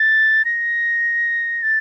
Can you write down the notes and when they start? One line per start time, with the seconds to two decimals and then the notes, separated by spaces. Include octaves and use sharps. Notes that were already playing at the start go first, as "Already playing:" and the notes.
Already playing: A6
0.45 A#6
1.63 A6